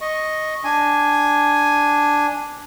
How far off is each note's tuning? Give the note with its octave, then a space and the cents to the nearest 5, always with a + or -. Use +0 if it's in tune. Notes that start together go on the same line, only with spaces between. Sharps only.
D#5 +0 C#6 -10
D4 +0 G#5 +0